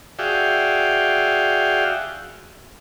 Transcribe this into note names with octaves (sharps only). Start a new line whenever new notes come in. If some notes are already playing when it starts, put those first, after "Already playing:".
F#4 G#4 D5 E5 F5 G5